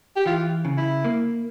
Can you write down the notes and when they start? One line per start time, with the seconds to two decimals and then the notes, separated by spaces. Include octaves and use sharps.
0.16 G4
0.26 E3 F4
0.65 C#3
0.78 E4
1.04 A#3